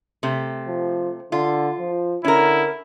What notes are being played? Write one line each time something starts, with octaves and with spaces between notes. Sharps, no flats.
C3 A3
F3
D3 F4
F3
D3 C#4 E4 A#4